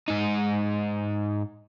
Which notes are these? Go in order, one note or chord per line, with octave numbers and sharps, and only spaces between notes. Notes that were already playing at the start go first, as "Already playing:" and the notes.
G#2 D#4